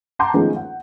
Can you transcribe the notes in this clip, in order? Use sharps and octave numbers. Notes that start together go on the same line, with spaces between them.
F#5 A5 A#5 C6 D6 G6
D#3 F3 G#3 A3 B3 C#4
F#5